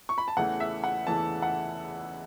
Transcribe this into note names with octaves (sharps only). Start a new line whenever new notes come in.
C#6
B5
A5
E2 C#3 E3 A3 F#5
E5
F#5
E2 C#3 E3 A3 A5
F#5